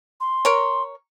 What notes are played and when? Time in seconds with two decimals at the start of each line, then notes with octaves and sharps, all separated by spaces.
0.21 C6
0.45 A#4 C#5